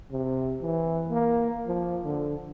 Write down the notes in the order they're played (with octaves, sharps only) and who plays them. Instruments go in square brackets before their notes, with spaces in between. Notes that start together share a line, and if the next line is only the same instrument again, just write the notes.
[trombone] C3
E3
A#3
F3
D3